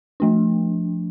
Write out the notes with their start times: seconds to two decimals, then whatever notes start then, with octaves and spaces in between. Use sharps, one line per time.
0.20 F3 A3 D4